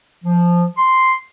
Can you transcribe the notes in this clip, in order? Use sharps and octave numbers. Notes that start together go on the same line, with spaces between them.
F3
C6